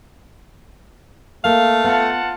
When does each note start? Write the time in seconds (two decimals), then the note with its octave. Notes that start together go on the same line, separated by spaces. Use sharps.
1.45 A3 A#3 F5
1.84 B3 F4 F#5 A5